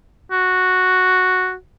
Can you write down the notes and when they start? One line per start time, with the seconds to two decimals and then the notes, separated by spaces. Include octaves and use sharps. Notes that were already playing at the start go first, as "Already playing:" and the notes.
0.32 F#4